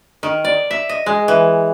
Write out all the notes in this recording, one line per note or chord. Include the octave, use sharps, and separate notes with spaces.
D#3
D5
E5
D#5
G#3
E3